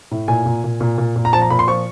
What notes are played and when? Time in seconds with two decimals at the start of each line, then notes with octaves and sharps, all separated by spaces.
0.11 A2
0.28 A#2 G#5
0.46 A#2
0.64 A#2
0.81 A#2
0.98 A#2
1.16 A#2
1.25 A#5
1.33 F3 A5
1.42 A#5
1.50 A#2 B5
1.59 C6
1.68 F3 C#6